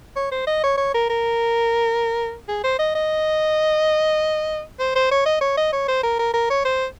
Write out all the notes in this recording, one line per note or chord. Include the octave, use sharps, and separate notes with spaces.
C#5
C5
D#5
C#5
C#5
A#4
A#4
G#4
C5
D#5
D#5
C5
C5
C#5
D#5
C#5
D#5
C#5
C5
A#4
A#4
A#4
C#5
C5